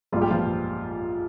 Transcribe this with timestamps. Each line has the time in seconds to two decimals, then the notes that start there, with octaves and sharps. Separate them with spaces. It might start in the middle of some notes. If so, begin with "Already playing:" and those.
0.12 A#1 G#2 G3 F4
0.22 G4
0.31 F3 F4